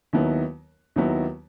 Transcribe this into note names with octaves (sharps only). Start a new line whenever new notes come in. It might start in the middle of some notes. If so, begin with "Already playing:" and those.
D#2 D#3 F#3 B3 E4
D#2 D#3 F#3 B3 E4